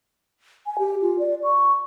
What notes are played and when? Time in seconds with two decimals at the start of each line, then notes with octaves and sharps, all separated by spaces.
0.66 G#5
0.79 G4
1.02 F4
1.19 D5
1.44 C#6